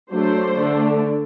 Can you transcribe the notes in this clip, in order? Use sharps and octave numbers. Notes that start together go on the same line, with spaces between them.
F#3 A3 D4 C5
D3 A3 D4